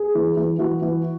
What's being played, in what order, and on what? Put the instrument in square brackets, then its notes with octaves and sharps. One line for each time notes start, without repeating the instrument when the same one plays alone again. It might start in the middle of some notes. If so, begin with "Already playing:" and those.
Already playing: [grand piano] G#4
E3
E3
E3 F#4
E3